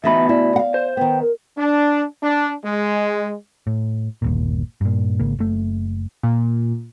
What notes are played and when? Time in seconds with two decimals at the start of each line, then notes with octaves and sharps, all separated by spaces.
0.04 D2 B2 E3 B3 D#4 E5 B5
0.29 E4 D5
0.56 F5 F#5
0.74 C5
0.97 D#3 B3 G5
1.22 A#4
1.58 D4
2.22 D4
2.64 G#3
3.67 A2
4.22 G1 D#2 A#2
4.81 G2 A#2
5.19 G#1 C#3 A#3
5.39 F#1 A3
6.23 A#2